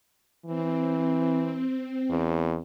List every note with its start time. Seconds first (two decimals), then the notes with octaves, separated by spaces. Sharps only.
0.45 E3 C4
2.10 E2